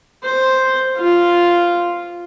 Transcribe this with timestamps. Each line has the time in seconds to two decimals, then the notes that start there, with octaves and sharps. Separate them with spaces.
0.24 C5
0.97 F4